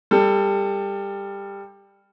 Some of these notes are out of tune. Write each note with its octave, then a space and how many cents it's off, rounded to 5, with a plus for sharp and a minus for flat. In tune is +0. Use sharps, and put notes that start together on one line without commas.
G3 +20 A4 +20